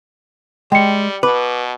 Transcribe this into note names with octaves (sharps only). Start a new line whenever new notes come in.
G3 G#3 G5 C#7
B2 B4 D6